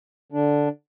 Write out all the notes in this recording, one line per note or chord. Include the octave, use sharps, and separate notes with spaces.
D3 D4